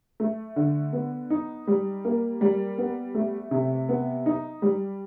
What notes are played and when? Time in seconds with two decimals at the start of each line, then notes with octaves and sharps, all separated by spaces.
0.20 A3
0.56 D3
0.93 B3
1.30 D#4
1.67 G3
2.05 A#3
2.41 G3
2.78 B3
3.15 A3
3.51 C3
3.89 B3
4.26 D#4
4.62 G3